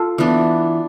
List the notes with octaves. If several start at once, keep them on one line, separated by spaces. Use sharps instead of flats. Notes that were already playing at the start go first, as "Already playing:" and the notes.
Already playing: F4 A4
E3 B3 D4